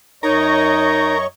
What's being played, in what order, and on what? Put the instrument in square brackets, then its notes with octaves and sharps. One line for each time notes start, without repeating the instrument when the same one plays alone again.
[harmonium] F#2 D#5 A#5 [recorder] D#4 [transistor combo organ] A#4 [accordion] C#5 C#6